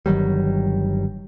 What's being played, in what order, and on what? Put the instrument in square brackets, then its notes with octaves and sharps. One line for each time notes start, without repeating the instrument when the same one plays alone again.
[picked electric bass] G1 D#3 F#3 G3